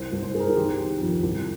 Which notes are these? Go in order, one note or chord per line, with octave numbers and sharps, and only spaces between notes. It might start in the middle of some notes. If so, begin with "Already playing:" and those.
Already playing: C2 C5
C2
C5
C2 G#4
A#4
G#4
D#3 G4
D#3
F2
C2